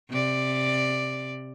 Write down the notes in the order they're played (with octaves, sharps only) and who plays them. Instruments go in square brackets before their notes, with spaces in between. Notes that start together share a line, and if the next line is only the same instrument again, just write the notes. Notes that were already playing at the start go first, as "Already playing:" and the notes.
[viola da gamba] C3 D5